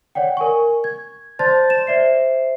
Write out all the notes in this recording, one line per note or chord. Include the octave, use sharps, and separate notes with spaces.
C#5 D5 F#5 G5
A#4 G#5 C#6
G#6
C5 D5 A5 C6 G6 A6
E7
C5 D5 E5 C7